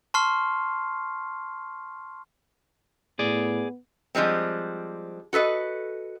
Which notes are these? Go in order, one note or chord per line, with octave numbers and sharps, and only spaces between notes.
A5 C6 C#6 F6 C7
A2 B3 G#4 D5
F3 G3 G#3 C4
F#4 A4 B4 D#5